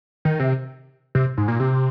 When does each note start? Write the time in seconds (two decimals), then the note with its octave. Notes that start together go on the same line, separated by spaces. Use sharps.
0.25 D#3
0.40 C3
1.15 C3
1.38 G#2
1.48 A#2
1.60 C3